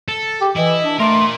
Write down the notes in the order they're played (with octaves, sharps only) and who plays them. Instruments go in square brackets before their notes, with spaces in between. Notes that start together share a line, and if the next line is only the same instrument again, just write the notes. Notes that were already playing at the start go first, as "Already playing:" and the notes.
[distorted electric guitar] A4
[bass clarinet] G4
[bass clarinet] E3 [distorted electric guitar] E4 [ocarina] D#5
[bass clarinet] D4
[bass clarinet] A3 [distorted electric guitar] A#4 D5 [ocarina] C6